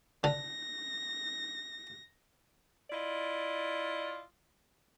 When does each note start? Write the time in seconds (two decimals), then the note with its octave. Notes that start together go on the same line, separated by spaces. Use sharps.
0.24 D3 A#6
2.90 E4 F4 D5 D#5